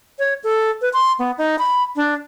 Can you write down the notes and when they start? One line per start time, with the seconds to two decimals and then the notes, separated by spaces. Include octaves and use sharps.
0.19 C#5
0.44 A4
0.81 B4
0.93 C6
1.19 B3
1.38 D#4
1.58 B5
1.96 D4